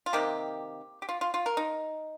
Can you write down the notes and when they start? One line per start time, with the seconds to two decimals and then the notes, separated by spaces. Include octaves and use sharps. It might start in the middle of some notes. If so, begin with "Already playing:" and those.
0.06 F4
0.13 C3 D#3 A#3 G4
1.02 G4
1.09 F4
1.21 F4
1.34 F4
1.46 A#4
1.57 D#4